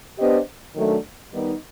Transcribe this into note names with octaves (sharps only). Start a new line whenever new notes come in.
B3 D4 G4 C5 D#5
D#3 F#3 A3 D4
D#3 G3 B3 D#4